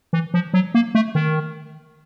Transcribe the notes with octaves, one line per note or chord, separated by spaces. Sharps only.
E3
F3
F#3
A#3
A3
D#3